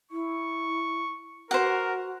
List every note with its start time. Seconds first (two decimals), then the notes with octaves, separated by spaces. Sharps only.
0.11 E4 C#6
1.51 F#4 A#4 C5 F#5